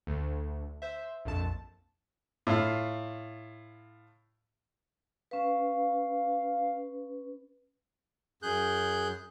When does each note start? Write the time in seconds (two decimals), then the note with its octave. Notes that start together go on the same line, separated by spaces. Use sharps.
0.07 D2
0.82 C5 E5
1.25 A#1 F2 A5
2.47 A2 F4 F5
5.31 C#4 B4 F5
8.43 F#2 G#4 F#6 G6